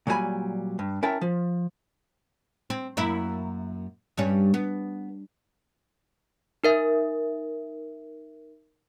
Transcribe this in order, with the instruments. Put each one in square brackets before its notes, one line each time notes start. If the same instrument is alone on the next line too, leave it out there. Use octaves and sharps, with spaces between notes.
[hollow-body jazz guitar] A#2 F#3 G3 G4 G#5 B5
G2
C#4 E4 A#4 E5 G5 A5
F3
[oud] C4
F#2 A#3 E4
G2 G3 C#4
B3
[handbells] D#4 A#4 E5